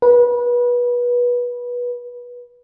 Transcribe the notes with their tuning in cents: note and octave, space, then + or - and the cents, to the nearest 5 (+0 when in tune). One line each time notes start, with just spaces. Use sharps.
B4 -25